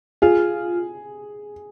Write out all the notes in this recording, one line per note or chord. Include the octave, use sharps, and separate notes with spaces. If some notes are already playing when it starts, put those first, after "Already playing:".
F4 G#4